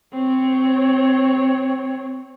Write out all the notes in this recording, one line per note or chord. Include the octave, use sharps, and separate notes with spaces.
C4 C#5